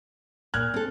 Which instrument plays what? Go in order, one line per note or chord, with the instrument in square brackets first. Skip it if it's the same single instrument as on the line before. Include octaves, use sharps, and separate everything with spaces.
[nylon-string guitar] A#2 [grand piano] F6 F#6 G#6
[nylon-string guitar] C4 A4